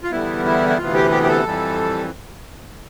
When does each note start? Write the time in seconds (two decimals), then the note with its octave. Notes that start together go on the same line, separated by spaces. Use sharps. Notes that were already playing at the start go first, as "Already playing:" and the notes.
0.03 F4
0.11 E2 D3 G3 B3 E4
0.45 E4
0.69 E4
0.78 D2 C3 E3 B3 F4
0.94 G4
1.11 G4
1.23 G4
1.28 A4
1.44 F2 E3 G3